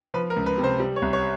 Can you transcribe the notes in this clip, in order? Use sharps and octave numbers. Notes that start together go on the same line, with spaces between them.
F3 B4
A#4
C#2
B4
C3
C5
G3
C#5
C2
C#5